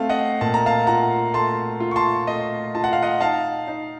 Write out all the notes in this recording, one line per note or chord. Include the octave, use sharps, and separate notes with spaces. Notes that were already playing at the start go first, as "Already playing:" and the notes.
Already playing: A3 C4 F5 A5
D#5 F#5
A#2 A5
A#5
F5 A5
F4 F#5 A#5
A3 A5 C6
F4
C#6
A5 C6
A3 D#5
F4 A5
F#5
F5
D#5 F#5
D#4 F5 A5
D#4